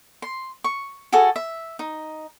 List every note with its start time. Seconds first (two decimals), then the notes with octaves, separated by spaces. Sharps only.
0.22 C6
0.64 C#6
1.12 F#4 G#4 A4 G#5
1.36 E5
1.79 D#4